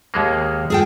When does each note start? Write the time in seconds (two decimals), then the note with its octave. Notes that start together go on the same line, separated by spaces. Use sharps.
0.14 D#2 G#3 A#3
0.70 G#4 A4 G5